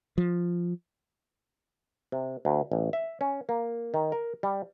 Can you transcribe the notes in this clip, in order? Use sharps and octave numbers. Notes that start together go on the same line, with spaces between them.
F3
C3
D2
A1
E5
C#4
A#3
D#3
A#4
G3